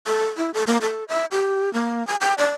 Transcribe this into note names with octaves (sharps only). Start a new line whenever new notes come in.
A4
E4
A4
A#3
A4
E5
G4
A#3
G#5
G5
D5